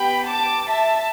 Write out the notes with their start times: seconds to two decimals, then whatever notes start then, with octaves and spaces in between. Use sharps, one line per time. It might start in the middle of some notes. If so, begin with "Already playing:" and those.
Already playing: B3 G4 G5 B5
0.29 A5 D6
0.67 E5 A5